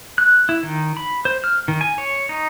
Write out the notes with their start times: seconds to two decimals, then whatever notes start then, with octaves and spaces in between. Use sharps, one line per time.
0.18 F#6
0.49 E4
0.63 D#3
0.97 B5
1.25 C5
1.44 F6
1.68 D#3
1.81 G#5
1.98 C#5
2.29 D#4